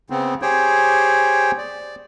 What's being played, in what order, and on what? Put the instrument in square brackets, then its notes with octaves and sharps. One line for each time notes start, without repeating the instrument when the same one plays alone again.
[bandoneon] C#3 B3 C4
G4 G#4 C5 C#5 G5
D5